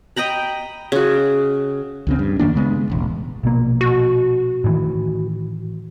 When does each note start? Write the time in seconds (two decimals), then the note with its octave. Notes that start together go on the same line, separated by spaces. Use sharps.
0.16 D#5 G5 A#5 B5
0.92 C#3 F#4
2.07 C#2 C#3 C4
2.19 G2
2.39 F#2 D#3 A#3 D4
2.55 C#3 G#3 B3
2.90 E1 A1
3.43 A#1 B2 A#3
3.81 F#4
4.64 A2 D#3 E3